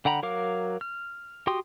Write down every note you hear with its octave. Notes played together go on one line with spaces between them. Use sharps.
D3 F#5 G5 A#5 B5
F#3 A#4 F5 D6
F6
F#4 G4 G5 C6 D#6